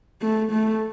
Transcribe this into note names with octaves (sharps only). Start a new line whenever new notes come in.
A3
A3